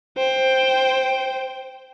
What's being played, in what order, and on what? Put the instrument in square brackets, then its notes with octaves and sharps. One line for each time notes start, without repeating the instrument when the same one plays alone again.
[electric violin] C5 G5